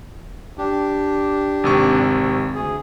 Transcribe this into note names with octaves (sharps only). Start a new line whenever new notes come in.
D4 G4
G#1 C3 C#6
D2 G#4